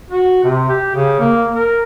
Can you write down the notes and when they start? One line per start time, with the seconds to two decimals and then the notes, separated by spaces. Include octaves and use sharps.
0.11 F#4
0.44 C3
0.69 G4
0.95 C#3
1.19 A#3
1.55 A#4